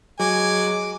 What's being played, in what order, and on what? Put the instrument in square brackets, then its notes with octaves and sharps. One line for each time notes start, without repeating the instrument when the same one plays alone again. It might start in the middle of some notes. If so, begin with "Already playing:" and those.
[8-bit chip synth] F#3 [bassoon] G#3 [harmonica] G#5 [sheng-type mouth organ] D6